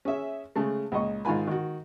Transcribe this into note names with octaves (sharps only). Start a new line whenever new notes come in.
C#4 G#4 E5
C#3 G#3 A3
C#2 A#2 D#5 C#6
G#2 D#3 D#4 F4 G#5 B5
D#3 F#4